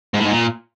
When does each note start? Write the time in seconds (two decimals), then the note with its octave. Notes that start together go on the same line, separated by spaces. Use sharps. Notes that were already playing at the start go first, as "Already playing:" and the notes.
0.14 G#2
0.19 A2
0.25 G#2
0.31 A#2